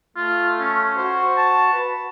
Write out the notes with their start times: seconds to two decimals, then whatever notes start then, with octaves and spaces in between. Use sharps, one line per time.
0.16 A3 F4
0.60 C#4
0.97 F#4 C5
1.37 A5
1.73 B4